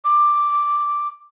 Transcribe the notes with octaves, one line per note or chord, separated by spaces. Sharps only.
D6